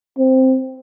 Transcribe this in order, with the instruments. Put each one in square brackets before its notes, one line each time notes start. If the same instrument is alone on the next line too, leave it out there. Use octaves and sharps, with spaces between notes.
[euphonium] C4